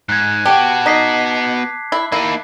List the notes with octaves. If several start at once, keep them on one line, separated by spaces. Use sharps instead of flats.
G#2 F#6 G#6
B3 F#4 G4 A5
D#4 D6 B6 C7
E4
A#3 D#4 E4